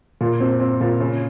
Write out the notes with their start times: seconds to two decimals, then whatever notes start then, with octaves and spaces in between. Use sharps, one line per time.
0.21 A#2
0.40 C4
0.60 C4
0.81 A#2
1.00 C#3